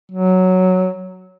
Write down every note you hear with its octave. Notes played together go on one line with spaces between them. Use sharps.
F#3